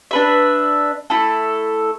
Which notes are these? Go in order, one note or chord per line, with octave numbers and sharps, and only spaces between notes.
D4 B4 E5
A3 E4 A4